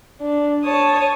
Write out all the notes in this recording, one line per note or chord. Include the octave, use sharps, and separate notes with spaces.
D4
C#5 A5 D#6